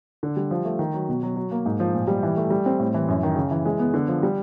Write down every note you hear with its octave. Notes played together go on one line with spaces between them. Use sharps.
D3
G3
F3
A3
D#3
F#3
B2
F#3
F#3
A#3
G#2
F3
A#2
G3
E3
A3
G3
C4
A2
E3
F#2
D#3
C#3
E3
G#3
B3
D3
F3
G3